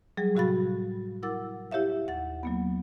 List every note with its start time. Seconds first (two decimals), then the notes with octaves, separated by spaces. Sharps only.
0.17 F#3 G3 G#4
0.35 A2 C3 F#4 F5 B5 A6
1.23 E4 A#4 F#5 D6 E6 A6
1.71 E4 G4 C#5 E5 F5
2.07 D#2 F#5 A6
2.43 F#3 A#3 B3